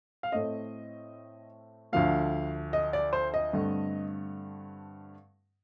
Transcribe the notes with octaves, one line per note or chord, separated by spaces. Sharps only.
F5
A2 A3 C4 D#5
D2 D3 F3 A3 F5
D#5
D5
C5
D#5
G2 D3 A3 C4